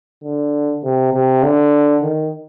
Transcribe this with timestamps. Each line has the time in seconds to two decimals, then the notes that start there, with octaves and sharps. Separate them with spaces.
0.24 D3
0.83 C3
1.13 C3
1.43 D3
2.02 D#3